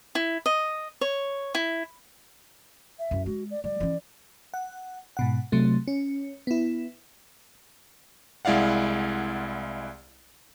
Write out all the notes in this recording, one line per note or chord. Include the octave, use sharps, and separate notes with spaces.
E4
D#5
C#5
E4
E5
F#2 E4
G#3 F#4
D5
G3 D5
E3 C#4
F#5
G#2 B2 F#5
C3 F#3 A3
C#4
B3 E4
C2 G#3 E4 D5 F5 F#5